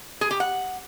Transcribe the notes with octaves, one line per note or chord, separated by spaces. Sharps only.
G#4
G4
F#5